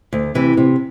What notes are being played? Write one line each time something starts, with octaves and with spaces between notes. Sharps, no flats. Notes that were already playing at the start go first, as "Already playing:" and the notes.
D2
C3 E3
C3